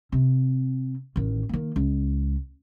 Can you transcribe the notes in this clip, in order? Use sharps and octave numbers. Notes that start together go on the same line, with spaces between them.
C3 C4
A1 D#3
D#3 A#3
C#2